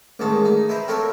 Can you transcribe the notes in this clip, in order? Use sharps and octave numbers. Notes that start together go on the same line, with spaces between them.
A1 G#2 D#3 C#5 A5
D#4
E4 B4 C5 A#5
C4 A4 A#4 C#5 E5 F5